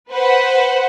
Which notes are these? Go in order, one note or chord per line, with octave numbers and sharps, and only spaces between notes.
B4 C5 F#5